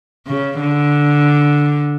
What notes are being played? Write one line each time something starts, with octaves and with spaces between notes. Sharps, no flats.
C#3
D3